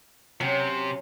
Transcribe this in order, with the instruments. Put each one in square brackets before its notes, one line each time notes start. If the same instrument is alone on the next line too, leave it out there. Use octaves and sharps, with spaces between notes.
[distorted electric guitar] C3 [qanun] F#3 C#4 F#4